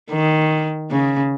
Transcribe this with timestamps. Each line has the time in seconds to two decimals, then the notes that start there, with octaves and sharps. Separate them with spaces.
0.11 D#3
0.91 C#3